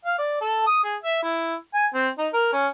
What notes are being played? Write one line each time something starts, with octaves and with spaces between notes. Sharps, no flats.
F5
D5
A4
D#6
G#4
E5
E4
G#5
C4
D#4
A#4
C#4